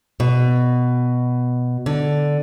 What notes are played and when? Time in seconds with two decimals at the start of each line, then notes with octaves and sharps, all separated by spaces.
0.20 B2
1.86 D3